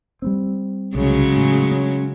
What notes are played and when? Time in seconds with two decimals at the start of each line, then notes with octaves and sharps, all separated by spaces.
0.22 G3 B3 C4
0.95 C2 C#3 F#3 G#3
1.36 A2
1.72 C#4